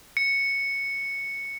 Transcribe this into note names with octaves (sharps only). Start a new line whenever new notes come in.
C#7